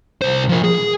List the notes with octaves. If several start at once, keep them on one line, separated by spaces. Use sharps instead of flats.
C2 C5
F3 A#4
G#4